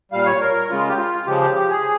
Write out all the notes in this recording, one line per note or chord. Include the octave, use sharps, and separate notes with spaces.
A#2 G3 F5
C#5
A#4
C#3 G#3 F4
G4
F4
C#3 F3 G#3 G4
G4
G4
G#4